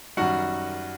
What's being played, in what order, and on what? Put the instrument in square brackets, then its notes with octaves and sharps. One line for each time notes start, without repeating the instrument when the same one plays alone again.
[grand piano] F#2 D#3 G3 F#4 F#5